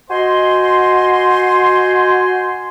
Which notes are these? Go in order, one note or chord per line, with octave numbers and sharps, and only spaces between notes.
F#4 C5 D#5 G#5 C6